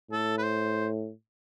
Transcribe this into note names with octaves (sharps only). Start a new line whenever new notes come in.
A2 A4
B4
C5